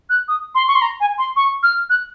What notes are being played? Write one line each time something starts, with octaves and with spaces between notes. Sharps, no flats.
F#6
D#6
C6
C#6
C6
A#5
G#5
C6
C#6
F6
F#6